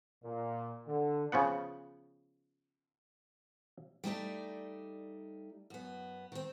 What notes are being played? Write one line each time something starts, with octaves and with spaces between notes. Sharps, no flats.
A#2
D3
C#3 F3 B3 F#5
G3 A3 D#4 D5
F#2 B3
D#3 C4